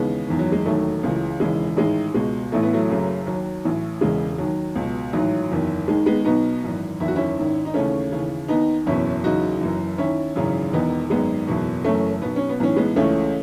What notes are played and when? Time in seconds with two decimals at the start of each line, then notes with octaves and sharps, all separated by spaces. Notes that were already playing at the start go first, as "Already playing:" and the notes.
Already playing: D#2 C#3 E3 G#3 B3
0.28 F#1 E2 D#3
0.39 F#3
0.52 G#3
0.66 E1 D#2 D#3 F#3 A3
1.03 C#2 C#3 E3
1.40 E1 D#2 C#3 E3 G#3
1.77 A1 G#2 D#3 G#3
2.14 C#2 B2 G#3
2.52 A1 A2 E3 A3
2.63 B3
2.74 F#3 A3
2.89 F#1 F#2 C#3
3.26 D#2 D#3 F#3
3.64 A1 A2 E3
4.01 E1 E2 C#3 G#3
4.38 D#2 D#3 F#3
4.76 C#2 B2
5.13 A1 G#2 D#3 F#3
5.51 F#1 E2 D#3
5.88 D#2 D#3 G#3
6.06 G#3 B3
6.25 B1 B2 B3 D#4
6.63 G#1 F#2 E3
7.00 F#1 E2 D#3 E4
7.08 F#4
7.16 C#4 E4
7.37 G#1 G#2 D#3
7.65 D#4
7.74 D#2 C#3 E3 A3 C#4
8.12 D#2 C#3 E3
8.48 D#2 D#3 B3 D#4
8.86 F#1 E2 B2 C#4 E4
9.23 F#1 E2 C#3 D#4 F#4
9.61 F#1 F#2 E3
9.98 D#2 D#3 C#4 E4
10.36 G#1 F#2 C#3 E3
10.73 E1 E2 D#3 B3 D#4
11.10 G#1 F#2 D#3 G#3 B3
11.47 F#1 E2 B2
11.84 F#1 F#2 E3 A3 C#4
12.22 B1 B2 B3
12.36 C#4
12.49 B3
12.60 B1 A2 E3 C#4
12.76 G#3 B3
12.96 C#2 C#3 E3 A3 C#4